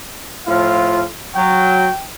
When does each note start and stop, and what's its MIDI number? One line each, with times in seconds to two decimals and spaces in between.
0.47 1.02 45
0.47 1.02 53
0.47 1.07 65
0.47 1.02 77
1.35 1.87 54
1.35 2.07 79